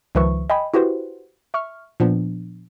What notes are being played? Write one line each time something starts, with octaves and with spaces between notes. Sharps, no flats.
C#2 D#3 F3 B4 E5 C#6
D#5 G5 G#5 B5
E4 F#4 G4 B4 C5
E5 C#6 F6
A#2 F3 B3 D4